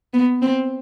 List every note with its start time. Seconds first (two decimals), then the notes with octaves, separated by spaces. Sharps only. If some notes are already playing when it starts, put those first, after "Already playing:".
0.13 B3
0.42 C4